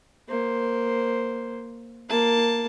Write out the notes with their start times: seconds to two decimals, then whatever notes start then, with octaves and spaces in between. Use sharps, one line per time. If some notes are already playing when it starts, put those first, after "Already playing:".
0.28 A#3 C5
2.08 A#3 A5